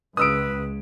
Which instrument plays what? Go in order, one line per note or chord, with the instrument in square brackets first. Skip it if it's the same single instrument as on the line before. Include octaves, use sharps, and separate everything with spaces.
[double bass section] C#2 [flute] B4 [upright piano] D#6 E6 D7